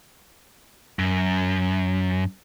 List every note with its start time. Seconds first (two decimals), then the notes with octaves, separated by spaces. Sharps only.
0.99 F#2